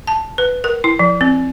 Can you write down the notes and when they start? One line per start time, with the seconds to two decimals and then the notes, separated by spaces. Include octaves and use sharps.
0.07 A5
0.38 B4
0.64 A#4
0.84 E4
0.99 F3
1.21 C4